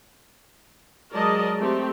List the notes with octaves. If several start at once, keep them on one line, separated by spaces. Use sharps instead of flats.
F#3 G#3 A#4 D5 D#5 A5
A3 C4 G4